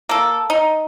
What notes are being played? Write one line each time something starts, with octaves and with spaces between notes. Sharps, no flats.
A#3 A4
D#4